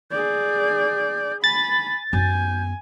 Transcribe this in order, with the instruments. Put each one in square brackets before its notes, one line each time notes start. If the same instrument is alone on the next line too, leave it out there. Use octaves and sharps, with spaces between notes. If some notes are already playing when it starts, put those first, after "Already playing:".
[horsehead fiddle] G#4 D5 [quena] G6
[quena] G#5 [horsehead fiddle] B5 [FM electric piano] A6
[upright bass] F#2 B3 [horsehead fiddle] G#5 [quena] G6